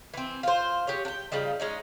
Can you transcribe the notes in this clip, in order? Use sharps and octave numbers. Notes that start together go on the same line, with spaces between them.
E3 C4
F4 C5
G4 G#4 C#5
D4 G5
C#3 F3 G3 D#4
G#3 C#4 D#4